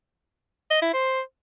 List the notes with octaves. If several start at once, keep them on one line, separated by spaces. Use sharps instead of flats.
D#5
E4
C5